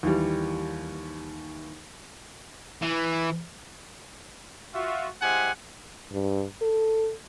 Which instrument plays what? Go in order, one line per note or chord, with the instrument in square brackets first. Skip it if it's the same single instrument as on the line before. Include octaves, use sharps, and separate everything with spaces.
[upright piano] D#2 E3 G3
[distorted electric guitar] E3
[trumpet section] F4 F#4 E5
G#3 E4 G4 C5 F#5 G#5
[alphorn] G2
A4